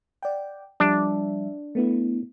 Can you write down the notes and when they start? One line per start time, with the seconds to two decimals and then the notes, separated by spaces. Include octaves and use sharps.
0.23 D5 F#5 G5
0.80 F3 G3 D4 E5
1.75 A3 B3 E4